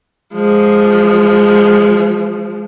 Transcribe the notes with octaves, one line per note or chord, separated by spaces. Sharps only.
F3 G#3